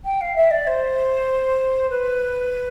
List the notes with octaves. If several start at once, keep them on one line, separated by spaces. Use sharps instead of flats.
G5
F5
E5
D5
C5
B4